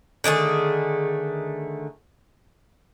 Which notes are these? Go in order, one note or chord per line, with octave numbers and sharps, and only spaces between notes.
D3 D#3 A3 G#4